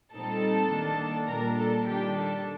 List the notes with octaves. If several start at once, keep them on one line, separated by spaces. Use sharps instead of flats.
A#2 G3 C4 D#4 A4 A5
D#3 A#3 D4
A#2 G3 D4 A#4 A#5
A4 A5
D#3 G3 D4 G4 G5
A4 A5